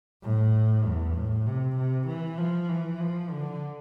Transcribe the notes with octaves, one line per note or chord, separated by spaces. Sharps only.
A2
E2
A2
C3
C3
E3
F3
E3
F3
D3